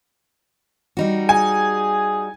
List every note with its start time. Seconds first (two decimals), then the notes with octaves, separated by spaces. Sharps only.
0.97 G3 D#4 F#4
1.29 G#4 G#5